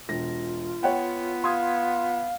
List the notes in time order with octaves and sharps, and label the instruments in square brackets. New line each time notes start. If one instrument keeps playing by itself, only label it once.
[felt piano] E1 A#6 [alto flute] F4
[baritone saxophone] B3 [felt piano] C#5 F#5 G5
[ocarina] F5 [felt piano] C6 D#6 G#6